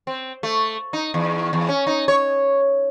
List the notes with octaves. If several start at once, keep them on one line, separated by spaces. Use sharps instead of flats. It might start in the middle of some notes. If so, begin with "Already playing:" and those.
C4
A3
D#4
E2
E2
C#4
D#4
C#5